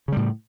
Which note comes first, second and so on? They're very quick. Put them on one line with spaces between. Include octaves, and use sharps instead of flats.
C#3 G3 A2